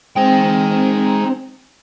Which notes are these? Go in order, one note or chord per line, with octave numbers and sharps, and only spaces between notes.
G#3 C4 D#4 G5